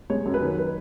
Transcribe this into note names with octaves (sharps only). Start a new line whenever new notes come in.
G#3 C#5
F#2
B4
D#3
B4